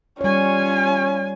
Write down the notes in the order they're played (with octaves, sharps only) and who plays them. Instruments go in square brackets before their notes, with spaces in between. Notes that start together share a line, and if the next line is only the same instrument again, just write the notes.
[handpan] G3 C#5 [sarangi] C#4 [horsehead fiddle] F4 G#5